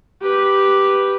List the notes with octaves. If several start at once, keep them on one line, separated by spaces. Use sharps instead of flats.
G4 B4